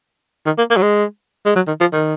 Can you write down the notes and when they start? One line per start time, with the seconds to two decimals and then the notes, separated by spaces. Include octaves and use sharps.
0.46 D#3
0.58 A#3
0.70 A#3
0.77 F#3
0.82 G#3
1.46 G#3
1.56 F#3
1.67 D#3
1.80 F3
1.93 D#3